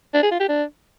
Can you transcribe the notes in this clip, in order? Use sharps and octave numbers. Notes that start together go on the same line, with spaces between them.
D4
G#4
F4
G4
D4